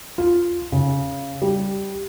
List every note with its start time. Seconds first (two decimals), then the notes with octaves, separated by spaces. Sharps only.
0.18 F4
0.72 C#3
1.42 G3